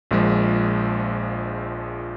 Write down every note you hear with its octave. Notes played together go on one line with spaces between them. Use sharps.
A#1 A#2 F3 G#3